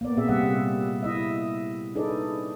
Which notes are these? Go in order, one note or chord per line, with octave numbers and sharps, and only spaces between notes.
A#3 B3 D5
A#2 C4 G#4 E5
C3 G3 E5 F#5
E4 D#5 E5
D4 D#4 G#4 A4 B4 D5